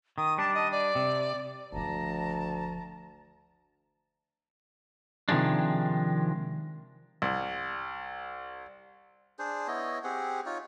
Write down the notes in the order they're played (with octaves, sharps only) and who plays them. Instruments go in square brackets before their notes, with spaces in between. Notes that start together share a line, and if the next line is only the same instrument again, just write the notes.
[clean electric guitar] D#3 [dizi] D#6
[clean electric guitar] G3 D4 [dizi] A5
[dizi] D#5
D5
[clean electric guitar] C3
[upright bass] F#1 F3 [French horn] D2 [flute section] A5 A#5
[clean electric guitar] C3 D#3 F3 G#3 D4
[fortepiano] C2
[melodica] D4 G#4 C5
B3 E4 C#5 D#5
C4 G4 G#4 F#5
D#4 F4 C#5